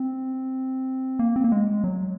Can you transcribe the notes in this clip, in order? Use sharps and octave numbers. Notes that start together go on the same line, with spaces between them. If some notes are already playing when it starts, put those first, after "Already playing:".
Already playing: C4
A#3
C4
A#3
G#3
F#3